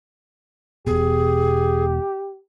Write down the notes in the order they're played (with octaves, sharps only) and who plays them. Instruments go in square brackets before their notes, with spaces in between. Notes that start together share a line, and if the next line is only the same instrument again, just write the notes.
[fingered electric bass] E1 B2 [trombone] G4 [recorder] G#4